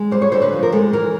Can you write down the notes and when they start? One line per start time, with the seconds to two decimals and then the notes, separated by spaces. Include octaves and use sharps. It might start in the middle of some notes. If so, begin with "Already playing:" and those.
Already playing: G#3
0.11 G3 C5
0.22 C#5
0.32 D3 C5
0.42 B4
0.53 F3
0.63 A#4
0.72 G#3 A4
0.93 E3 A#4